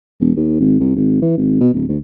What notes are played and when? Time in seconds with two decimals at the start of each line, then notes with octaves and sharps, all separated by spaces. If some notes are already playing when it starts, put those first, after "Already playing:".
0.20 E1
0.36 D#2
0.60 G#1
0.80 C2
0.96 G#1
1.22 E3
1.37 G#1
1.61 B2
1.73 D1
1.88 D2